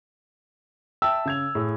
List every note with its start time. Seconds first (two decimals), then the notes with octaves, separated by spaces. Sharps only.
1.02 E5 G5 A5 E6
1.25 C#3 G#6 F7
1.55 A2 G#4